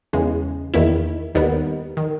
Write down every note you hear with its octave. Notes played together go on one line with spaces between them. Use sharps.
E2 C#3 G#3
E2 D#3 A#3 E4
D#2 D#3 G3 B3
D#3